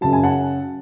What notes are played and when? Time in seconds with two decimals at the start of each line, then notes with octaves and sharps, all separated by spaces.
0.01 F#2 C#3 F#3 A5
0.13 G#5
0.24 F#5 A5